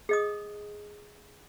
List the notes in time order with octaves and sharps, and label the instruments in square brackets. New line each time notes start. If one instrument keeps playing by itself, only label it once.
[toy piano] G#4 D#5 D#6